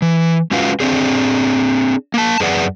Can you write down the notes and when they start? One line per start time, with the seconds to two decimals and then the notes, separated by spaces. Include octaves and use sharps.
0.02 E3
0.51 G#3 C#4 F4 F#4 B4 F5
0.80 C4 D4 G#4
2.14 A#3 A5
2.40 F#2 G#4 B4 D5 F#5